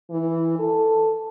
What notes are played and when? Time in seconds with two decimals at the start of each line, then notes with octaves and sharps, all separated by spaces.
0.10 E3
0.59 A4